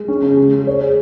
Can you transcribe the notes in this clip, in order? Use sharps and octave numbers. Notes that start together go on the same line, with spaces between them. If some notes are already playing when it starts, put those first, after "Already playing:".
Already playing: G#3
C#4
C#3
G#3
G#3
C#5
G#4